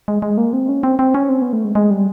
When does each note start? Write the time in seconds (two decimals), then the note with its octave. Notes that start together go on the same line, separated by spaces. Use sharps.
0.08 G#3
0.22 G#3
0.37 A#3
0.53 C4
0.69 C#4
0.83 C4
0.99 C4
1.15 C#4
1.29 C4
1.42 B3
1.53 A3
1.65 G#3
1.75 G#3
1.90 G3